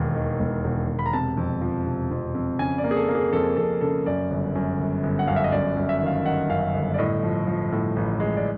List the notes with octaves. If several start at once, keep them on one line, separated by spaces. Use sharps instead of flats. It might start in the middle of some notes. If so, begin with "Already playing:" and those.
Already playing: E1 D#2
D#3
E1
E1
E1
B5
A#5
C3 A5
F2
F3
C3
F2
F2
C#3 G#5
D5
A#3
G#4
A4
A#3
G#4
F2 A4
F2 A4
C#3 A4
F#2 D5
G1
F#2
G1
G1
F#5
F#2 F5
E5
D#5
F#2 D5
F#2
E5
D#3 F5
D#3 F#5
F#2 F5
G1
D5
A2 D#5
F3
F3
A2
A1
G#3
D5